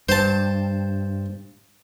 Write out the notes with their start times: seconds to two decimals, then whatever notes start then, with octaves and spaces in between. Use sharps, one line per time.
0.09 G2 C5 A5